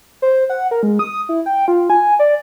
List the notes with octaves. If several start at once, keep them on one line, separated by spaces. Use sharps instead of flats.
C5
F#5
A#4
G#3
D#6
E4
G5
F4
G#5
D5